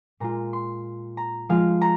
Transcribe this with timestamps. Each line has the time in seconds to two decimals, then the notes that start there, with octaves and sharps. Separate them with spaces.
0.20 A#2 G#3 F4 A#5
0.53 C6
1.17 A#5
1.49 F3 G#3 F4 F5
1.81 A#5